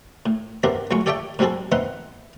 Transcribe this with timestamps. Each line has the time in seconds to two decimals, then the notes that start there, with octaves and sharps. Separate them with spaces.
0.26 A2
0.63 B3 C4 D4 E4 G4 A#4
0.91 C#2 F#3 A3 C#4 C#6
1.06 G4 A4 C#5 D5 E5 G5
1.39 G#2 F#3 G3 C4 G#4 A4
1.72 B3 C4 D#4 E5 F#5